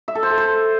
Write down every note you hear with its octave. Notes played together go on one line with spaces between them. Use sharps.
E5
A4
C5
A4
C5